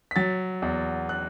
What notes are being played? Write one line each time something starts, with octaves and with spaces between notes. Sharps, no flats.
B6
F#3 A6
E2
F#6